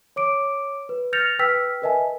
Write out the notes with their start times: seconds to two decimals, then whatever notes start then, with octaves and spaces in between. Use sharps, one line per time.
0.16 C#5 D6 D7
0.89 B4
1.13 F6 G6 A6 A#6 C#7 F7
1.39 B4 G5 E6 F6 B6
1.82 A#4 B4 D#5 E5 G#5 A5